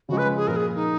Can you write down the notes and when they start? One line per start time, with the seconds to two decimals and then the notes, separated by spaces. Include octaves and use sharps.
0.09 C#3 F3 G#3 F#4
0.18 B4
0.37 G#4
0.47 A#2 F3 A#3 A#4
0.56 G#4
0.75 D#4